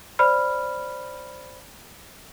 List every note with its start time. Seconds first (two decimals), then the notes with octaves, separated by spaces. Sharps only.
0.19 C5 D5 B5 F6